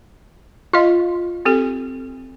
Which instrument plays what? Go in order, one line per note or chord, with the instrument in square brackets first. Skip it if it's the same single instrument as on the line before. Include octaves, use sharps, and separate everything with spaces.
[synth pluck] F4 [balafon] D#5 F5
[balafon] C4 G4 A4